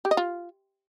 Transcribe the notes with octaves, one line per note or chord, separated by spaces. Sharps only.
G4
D#5
F4